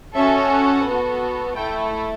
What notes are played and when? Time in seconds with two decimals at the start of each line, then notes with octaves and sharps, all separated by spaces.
0.15 C#4 F#4 A4 E5
0.51 F#5
0.86 B3 F#4 A4
1.56 A3 E4 A4 G5